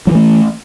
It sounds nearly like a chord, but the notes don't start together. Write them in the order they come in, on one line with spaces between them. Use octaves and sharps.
F#3 E3 A3